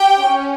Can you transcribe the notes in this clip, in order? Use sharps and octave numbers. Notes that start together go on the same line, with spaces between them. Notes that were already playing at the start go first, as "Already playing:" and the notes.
Already playing: G4 G5
C#4